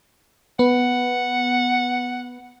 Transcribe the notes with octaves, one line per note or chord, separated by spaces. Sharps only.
B3 F#5